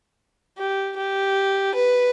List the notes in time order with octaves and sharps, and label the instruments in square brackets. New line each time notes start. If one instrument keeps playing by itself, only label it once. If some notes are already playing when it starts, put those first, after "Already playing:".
[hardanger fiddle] G4
G4
B4